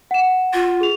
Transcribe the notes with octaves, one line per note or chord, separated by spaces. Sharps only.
F#5 E7
F4
G#4 F7